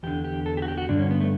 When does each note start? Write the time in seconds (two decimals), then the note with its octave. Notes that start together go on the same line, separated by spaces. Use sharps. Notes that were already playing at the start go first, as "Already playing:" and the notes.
0.03 E2 D3 G4
0.24 G4
0.46 A4
0.57 G4
0.62 F#4
0.68 G4
0.78 F#4
0.89 G2 D3 D4
0.99 C#4
1.11 B3
1.21 A3